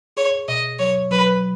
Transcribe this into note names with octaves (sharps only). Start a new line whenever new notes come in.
G#4 C#5
B2 D#5
F#3 C#5
F#3 B4